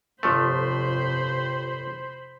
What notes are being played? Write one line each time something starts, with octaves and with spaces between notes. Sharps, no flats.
G1 F2 C3 F3 A3 C5 B5